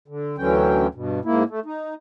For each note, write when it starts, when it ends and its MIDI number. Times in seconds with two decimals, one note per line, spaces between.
0.08 0.36 50
0.38 0.87 38
0.38 0.87 50
0.38 0.87 52
0.38 0.87 54
0.38 0.87 61
0.38 0.87 79
0.95 1.20 43
0.95 1.20 47
1.25 1.43 44
1.25 1.43 58
1.25 1.43 64
1.49 1.60 57
1.66 1.94 63